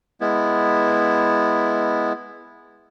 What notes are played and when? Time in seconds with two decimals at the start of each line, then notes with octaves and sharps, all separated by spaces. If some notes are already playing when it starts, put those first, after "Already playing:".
0.21 G#3 B3 E4